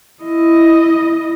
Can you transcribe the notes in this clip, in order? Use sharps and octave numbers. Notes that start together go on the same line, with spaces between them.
E4 D#5